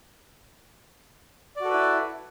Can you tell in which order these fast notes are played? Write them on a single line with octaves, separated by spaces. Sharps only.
D5 F#4 A4 B4 E4